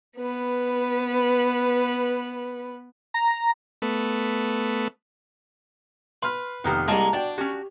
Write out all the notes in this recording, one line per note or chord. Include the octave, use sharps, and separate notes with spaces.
B3 B4
A#5
A3 B3
B4 C6 F6
F1 A#2 D#3 B3 G4
C2 G#3 A#3 E4 D#5 A5 A#5
D4 F#4 D5 G5
C#4 F#4 G4